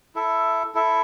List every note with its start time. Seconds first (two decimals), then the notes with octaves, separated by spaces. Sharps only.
0.15 E4 A4 E5
0.74 E4 A4 E5